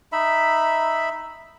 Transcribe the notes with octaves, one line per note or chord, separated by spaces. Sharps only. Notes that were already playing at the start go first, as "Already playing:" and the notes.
D#4 E5 B5